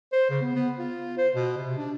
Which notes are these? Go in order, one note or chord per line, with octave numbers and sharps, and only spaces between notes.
C5
C#3
B3
B3
F4
C5
B2
C3
D4